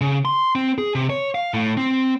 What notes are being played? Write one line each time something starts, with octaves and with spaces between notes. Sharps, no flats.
C#3
C6
C4
G#4
C3
C#5
F5
A2
C4